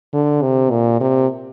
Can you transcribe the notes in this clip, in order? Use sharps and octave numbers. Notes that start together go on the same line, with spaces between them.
D3
C3
A#2
C3